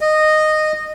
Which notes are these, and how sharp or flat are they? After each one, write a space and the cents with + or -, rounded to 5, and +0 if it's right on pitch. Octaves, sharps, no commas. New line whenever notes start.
D#5 -15